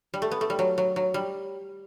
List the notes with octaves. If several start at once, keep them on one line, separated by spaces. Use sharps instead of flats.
G3
A3
B3
A3
G3
F#3
F#3
F#3
G3